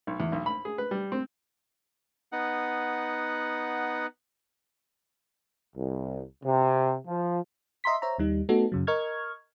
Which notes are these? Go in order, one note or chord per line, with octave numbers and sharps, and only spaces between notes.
B1
E2
B1
B5
G#4
B4
G3
C4
B3 D#4 F#5
C2
C3
F3
D#5 E5 A#5 C6 B6
C5 C#5 E5 A#5
D#2 G3 D#4
A3 B3 D#4 F#4 A4
F#2 C#3 F#3
A#4 D#5 C#6 F6 G#6